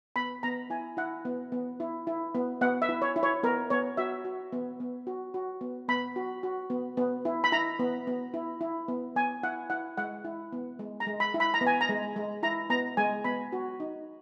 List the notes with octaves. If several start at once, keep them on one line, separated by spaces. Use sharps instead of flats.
B3 B5
B3 A#5
E4 G#5
E4 F#5
B3
B3
E4
E4
B3
B3 F#5
E5
E4
C#5
E4
C#5
B3 A#4
B3 C#5
F#4 E5
F#4
B3
B3
F#4
F#4
B3
B3 B5
F#4
F#4
B3
B3
E4
B5
E4 A#5
B3
B3
E4
E4
B3
B3 G#5
E4 F#5
E4 F#5
G#3 F#5
E4
B3
G#3
A#5
G#3
B5
E4
B5
A#5
B3
G#5
A#5
G#3
G#3
E4 A#5
B3 A#5
G#3 G#5
B3 B5
F#4
D#4